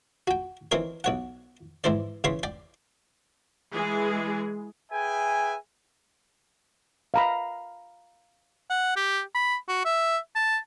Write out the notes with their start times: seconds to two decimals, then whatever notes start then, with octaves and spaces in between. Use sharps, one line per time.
0.27 F#4 G5
0.72 E3 C4 D#4 A#4 C#5
1.04 B1 C#5 F#5
1.84 G#2 E3 E4 C5 D5
2.24 C#3 E3 C#5 B5 C6
2.43 D5 G5
3.73 E3 G#3 G#4
4.92 G#4 B4 E5 G5 G#5
7.14 F5 A#5 B5
8.70 F#5
8.96 G4
9.35 B5
9.69 F#4
9.85 E5
10.35 A5